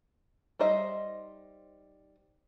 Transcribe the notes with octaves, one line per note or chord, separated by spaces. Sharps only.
G3 D#4 C5 D#5 E5